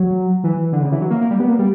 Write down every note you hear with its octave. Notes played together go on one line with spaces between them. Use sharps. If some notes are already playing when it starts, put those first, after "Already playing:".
Already playing: F#3
E3
D3
C#3
E3
F#3
A#3
A#3
G3
B3
A#3
G3